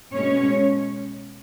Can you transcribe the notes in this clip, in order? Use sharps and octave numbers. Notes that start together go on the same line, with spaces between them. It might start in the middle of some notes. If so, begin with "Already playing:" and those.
B2 G#3 C#4 C#5